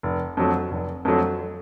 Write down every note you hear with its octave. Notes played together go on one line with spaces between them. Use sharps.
F1
F2 D3 F#3 A3
F1
F2 D3 F#3 A3